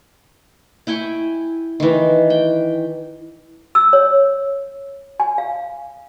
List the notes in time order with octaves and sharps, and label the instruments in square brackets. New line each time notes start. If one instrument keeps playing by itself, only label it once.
[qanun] E4 G5 G#5 C#6
D#3 E3
G5
[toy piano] E6
C#5
G#5
F5